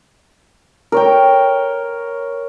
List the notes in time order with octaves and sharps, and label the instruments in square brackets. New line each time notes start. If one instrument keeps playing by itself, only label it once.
[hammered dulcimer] A#4 C#5 G5